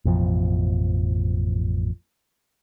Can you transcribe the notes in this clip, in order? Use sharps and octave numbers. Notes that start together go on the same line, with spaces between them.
A1 F2 B2 F3